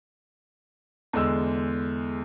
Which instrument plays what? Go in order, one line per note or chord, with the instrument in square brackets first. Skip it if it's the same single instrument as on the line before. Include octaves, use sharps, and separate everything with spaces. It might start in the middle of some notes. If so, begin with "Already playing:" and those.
[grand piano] E2 D3 G#3 E6